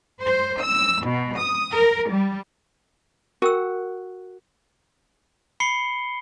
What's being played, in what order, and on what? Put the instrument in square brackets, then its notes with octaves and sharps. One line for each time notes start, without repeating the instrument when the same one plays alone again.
[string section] C5
E6
B2
D#6
A#4
G3
[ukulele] F#4 [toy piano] A#4 G5 E6
[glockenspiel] B5 C7 C#7 G7